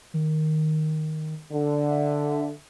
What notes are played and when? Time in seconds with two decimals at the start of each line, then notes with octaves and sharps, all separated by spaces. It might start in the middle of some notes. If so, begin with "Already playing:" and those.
0.14 D#3
1.52 D3
1.90 E5